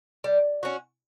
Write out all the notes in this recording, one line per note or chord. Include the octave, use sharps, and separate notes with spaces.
G3
C#4 F#4